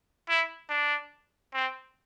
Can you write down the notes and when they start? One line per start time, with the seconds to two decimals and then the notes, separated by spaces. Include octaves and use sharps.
0.29 E4
0.70 D4
1.53 C4